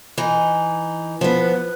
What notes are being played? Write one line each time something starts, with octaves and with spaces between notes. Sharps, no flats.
E3 D#4
F3 B3 B4